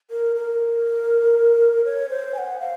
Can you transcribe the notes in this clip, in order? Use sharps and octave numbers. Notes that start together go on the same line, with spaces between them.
A#4
A#4
C#5
C5
G#5
F#5
F5